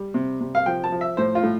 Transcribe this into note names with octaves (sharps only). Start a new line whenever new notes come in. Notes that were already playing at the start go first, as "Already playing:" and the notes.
Already playing: G3
C3
C3
F5
F3 G5
A5
F3
E5
A2 C5
F4
A2